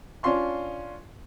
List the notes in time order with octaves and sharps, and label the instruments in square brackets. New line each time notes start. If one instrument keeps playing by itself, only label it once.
[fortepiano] C#4 D4 F4 C6 C#6